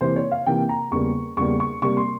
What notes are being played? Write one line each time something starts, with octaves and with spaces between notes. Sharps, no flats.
C3 E3 A#3 C5
C#5
F5
C3 E3 A#3 G5
A#5
E2 C#3 G3 A#3 C#6
E2 C#3 G3 A#3 C#6
C#6
C3 G3 A#3 C#6
C6